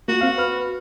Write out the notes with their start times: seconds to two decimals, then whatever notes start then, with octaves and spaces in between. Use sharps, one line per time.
0.08 A#3 F4 F#4
0.21 C4 F5
0.38 B4 F6